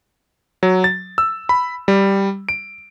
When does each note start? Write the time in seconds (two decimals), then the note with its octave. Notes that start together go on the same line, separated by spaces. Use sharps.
0.63 F#3
0.84 A6
1.18 E6
1.49 B5
1.88 G3
2.49 D7